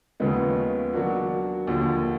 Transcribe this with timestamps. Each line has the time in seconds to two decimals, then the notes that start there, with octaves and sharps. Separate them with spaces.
0.20 D#2 C#3 F3 G#3 B3
0.93 F#3 A#3 D4 F#4
1.67 D#2 D3 F3